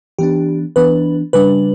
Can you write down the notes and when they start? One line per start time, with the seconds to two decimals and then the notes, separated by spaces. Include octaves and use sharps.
0.19 E3 B3 D4 G4
0.76 E3 B3 D4 B4
1.33 C#3 G3 D4 B4